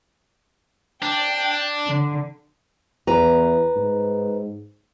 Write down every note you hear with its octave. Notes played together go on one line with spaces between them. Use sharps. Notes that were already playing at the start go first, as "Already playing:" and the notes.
D4 G5
D3
E2 B4 A#5
G#2